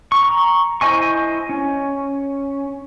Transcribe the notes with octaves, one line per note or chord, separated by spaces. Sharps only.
A#5 C#6
E4 C5 D#5 G#5 C#6
C#4